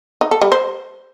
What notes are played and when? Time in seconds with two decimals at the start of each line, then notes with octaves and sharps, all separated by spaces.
0.21 D#4
0.31 A4
0.41 G3
0.52 C5